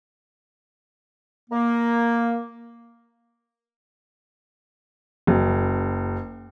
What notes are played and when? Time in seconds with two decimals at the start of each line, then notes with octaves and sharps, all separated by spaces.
1.51 A#3
5.27 F#1